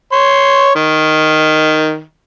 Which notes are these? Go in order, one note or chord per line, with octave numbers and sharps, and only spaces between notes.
C#5 C6
D#3